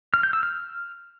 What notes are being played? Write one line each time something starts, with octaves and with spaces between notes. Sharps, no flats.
F6
G6
E6
F6